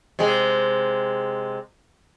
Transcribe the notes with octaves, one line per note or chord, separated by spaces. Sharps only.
C3 G#3